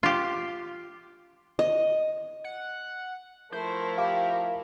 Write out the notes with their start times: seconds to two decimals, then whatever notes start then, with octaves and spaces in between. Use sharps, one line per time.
0.03 F4 G4
1.59 D#5
2.44 F#5
3.52 F3 A3 E4 A#4 C5
3.98 G4 F5